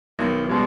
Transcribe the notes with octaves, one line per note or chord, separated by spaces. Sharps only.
B1 D#3
E3
B2 G3 G#3